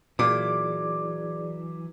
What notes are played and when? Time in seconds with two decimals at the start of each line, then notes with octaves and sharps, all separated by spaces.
0.19 A#2 E3 F#3 G#4 D5 D6